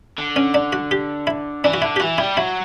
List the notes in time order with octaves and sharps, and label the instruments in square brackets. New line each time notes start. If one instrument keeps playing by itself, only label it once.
[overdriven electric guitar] D3
[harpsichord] C#4
D4
F#4
G4
E4
[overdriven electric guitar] E3 [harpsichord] D4
[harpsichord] F#4
[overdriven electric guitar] D3 [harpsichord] E4
[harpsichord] G4
[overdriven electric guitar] E3 [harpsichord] F#4
[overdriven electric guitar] G3 [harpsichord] E4
[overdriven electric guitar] F#3 [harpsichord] E4